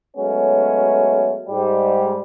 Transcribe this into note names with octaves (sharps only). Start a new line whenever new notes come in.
F#3 G#3 A3 B3 C#4
G#2 G3